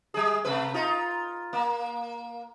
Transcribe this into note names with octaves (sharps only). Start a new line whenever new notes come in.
G3 G#4
C3 A3 B4
D#4 F4
A#3